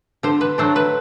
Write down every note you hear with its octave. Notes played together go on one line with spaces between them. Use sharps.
D3 C5
B4
F#3 A3 D4 C5
B4